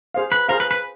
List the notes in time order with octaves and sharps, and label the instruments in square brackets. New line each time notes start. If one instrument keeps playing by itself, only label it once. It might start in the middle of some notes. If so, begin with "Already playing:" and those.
[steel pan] G#4 C5 F5
[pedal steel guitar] B4
[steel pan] G#4 C5 F5 [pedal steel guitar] A#4
[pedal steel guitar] B4
B4